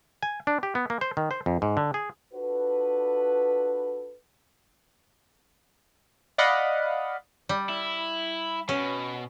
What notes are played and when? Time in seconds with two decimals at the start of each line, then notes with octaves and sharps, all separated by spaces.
0.23 G#5
0.47 D4
0.63 G4
0.75 B3
0.90 A#3
1.01 C5
1.17 D#3
1.31 C5
1.46 F2
1.62 G#2
1.77 D3
1.94 G#4
2.33 D4 F4 F#4 A4 B4
6.38 D5 D#5 F5 F#5 B5
7.49 G3
7.69 E4
8.69 B2 C#4